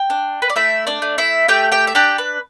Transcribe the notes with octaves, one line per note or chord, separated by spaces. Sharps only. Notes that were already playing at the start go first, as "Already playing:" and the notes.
Already playing: G5
D4
B4
D5
A3 E4 E5
D4 D5
A3
E4 E5
A3 G4 G5
G4 G5
E5
D4 G4 G5
B4